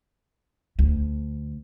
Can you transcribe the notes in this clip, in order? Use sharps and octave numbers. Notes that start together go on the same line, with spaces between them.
D2